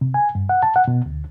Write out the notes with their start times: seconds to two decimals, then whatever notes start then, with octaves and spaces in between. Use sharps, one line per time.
0.01 C3
0.14 G#5
0.35 G2
0.49 F#5
0.63 A5
0.76 F#5
0.88 B2
1.06 D2